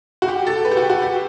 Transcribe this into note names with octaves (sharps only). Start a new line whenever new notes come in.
F#4
G4
A4
B4
G4
F#4
F#4
G4